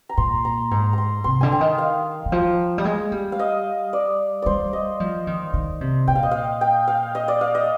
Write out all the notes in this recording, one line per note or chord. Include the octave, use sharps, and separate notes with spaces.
A#5
A#2 C6
A#5
G#2 A#5
A#5 C6
C3 C6
D3 G#5
G5
D#3
F5
D#3
F3
G3
G#3
G3
F5
D#5
D5
G3 C5 D5
D#5
F3
D#3
D#3
C3
A#2 G5
F5
D#5
F5
G5
F5
D#5
D5
F5
D#5